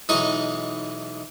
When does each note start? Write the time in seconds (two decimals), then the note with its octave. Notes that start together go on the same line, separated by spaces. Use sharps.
0.09 B1 E3 G#3 D#4 D#5 C#6